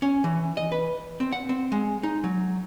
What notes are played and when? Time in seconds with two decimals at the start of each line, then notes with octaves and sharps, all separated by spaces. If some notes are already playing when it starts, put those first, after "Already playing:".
0.02 C#4
0.24 E3
0.57 D#5
0.72 B4
1.20 C4
1.32 F#5
1.49 C4
1.72 G#3
2.03 D#4
2.24 F#3